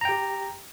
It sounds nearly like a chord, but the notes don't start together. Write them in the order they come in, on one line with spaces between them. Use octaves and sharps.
A#5 G5 G4